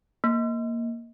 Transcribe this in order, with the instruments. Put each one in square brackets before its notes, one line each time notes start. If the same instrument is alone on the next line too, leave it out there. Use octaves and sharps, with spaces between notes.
[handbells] A#3